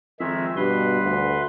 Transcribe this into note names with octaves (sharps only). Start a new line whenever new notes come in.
F2 D#3 G#3 E5
G2 B2 B4 C6
D2